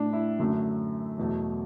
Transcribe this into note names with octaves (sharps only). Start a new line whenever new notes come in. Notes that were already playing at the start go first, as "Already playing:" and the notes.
Already playing: A2 A3 D4
E4
F#2 D3 F#3 A3
E2 B2 F#3 A3